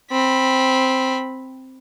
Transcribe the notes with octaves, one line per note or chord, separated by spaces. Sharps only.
C4 B5